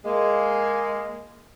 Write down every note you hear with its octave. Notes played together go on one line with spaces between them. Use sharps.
G#3 A#3